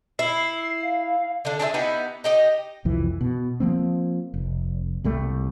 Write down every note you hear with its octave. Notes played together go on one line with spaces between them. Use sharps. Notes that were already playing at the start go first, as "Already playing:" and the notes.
E4 C7
F5
D3 D4
D4 G#4 C5 E5
B3 D#4 E4 G4
D#4 G4 D#5
C2 F2 E3
B2
F3 A#3 C4
F1
C2 G3 A3